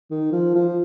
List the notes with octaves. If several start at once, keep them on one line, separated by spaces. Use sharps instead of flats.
D#3
F3
F3